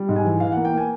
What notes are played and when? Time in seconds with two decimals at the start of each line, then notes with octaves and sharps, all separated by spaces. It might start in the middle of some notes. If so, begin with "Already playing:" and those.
Already playing: G3
0.09 G#2
0.16 G#5
0.24 E3
0.40 E3 F5
0.52 A#3 F#5
0.65 G5
0.73 A#3 G#5